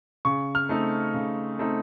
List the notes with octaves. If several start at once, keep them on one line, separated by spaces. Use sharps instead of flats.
C#3 C#6
F6
A3 C4 D#4
C#3
A3 C4 D#4